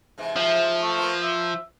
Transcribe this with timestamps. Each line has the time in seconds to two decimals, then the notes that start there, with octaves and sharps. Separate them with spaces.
0.18 G#2 C3 E3
0.36 F3
0.82 A3
0.98 A#3 B3 F4
1.22 E5